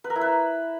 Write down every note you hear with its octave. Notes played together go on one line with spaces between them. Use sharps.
B4
A#4
E4
B4